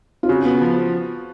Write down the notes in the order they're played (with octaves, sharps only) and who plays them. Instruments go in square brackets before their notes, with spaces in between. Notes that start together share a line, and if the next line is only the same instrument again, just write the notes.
[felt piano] F4
[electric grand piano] C#3 [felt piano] F#4
[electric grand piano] B3
F3